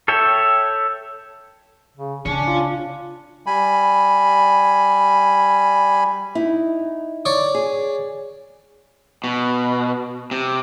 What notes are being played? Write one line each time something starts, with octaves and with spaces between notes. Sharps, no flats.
A4 C#5 E5 G5
C#3
C#3 C#4 D4
F4
G3 G#5 B5
D#4 E4
C#5 D5 C#6
G#4
B2
C3